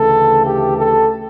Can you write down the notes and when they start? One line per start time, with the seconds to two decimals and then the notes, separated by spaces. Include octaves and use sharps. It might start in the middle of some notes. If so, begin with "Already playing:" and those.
Already playing: D2 C#3 E3 A3 A4
0.46 G4
0.78 A4